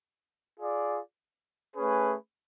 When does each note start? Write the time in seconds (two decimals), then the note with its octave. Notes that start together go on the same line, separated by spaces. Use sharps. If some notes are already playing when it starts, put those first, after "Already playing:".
0.59 F4 G#4 D5
1.75 A3 C#4 G#4 B4